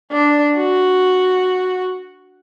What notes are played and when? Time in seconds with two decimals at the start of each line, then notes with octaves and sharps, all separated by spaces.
0.12 D4
0.57 F#4